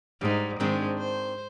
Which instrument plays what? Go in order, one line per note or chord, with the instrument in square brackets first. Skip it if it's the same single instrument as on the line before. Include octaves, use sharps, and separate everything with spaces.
[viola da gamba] G#2 [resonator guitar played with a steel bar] G3 D#4
[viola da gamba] G#2 G#3 [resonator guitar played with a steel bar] D#3 C4 D4
[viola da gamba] C5